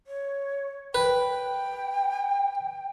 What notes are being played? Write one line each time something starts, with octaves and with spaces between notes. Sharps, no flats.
C#5
B4 G5